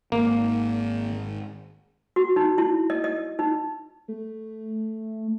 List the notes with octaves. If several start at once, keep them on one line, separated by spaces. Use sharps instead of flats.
G#1 A#3
F#4
D#4
E4
D#5
D#5
D#4
A3